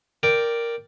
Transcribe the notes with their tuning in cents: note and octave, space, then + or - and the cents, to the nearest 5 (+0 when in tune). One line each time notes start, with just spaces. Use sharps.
A#4 +0 D5 +0 G5 +0